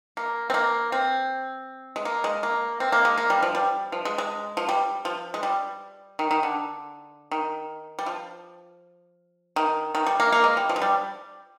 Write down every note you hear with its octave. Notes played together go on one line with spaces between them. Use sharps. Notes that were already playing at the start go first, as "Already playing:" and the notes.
A#3
C4
A#3
C4
G#3
A#3
G#3
A#3
C4
A#3
G#3
A#3
G3
F3
G3
F3
G#3
G#3
F3
G3
F3
G#3
G3
D#3
D#3
D3
D#3
G3
F3
D#3
D#3
G3
A#3
A#3
G#3
G3
F3
G#3
G3